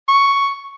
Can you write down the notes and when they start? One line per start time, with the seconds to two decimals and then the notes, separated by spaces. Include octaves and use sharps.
0.09 C#6